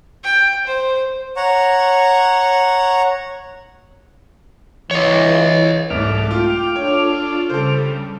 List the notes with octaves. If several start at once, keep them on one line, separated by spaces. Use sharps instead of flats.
G5
C5
C#5 F#5 A#5 C#6
E3 C#5 D#5
C2 G#2 A3 A4 D6 F6
F4 G5
D4 F4 A4 C#5
C#3 G3 A4 C5